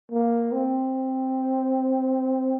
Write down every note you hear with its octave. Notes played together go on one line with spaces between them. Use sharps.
A#3
C4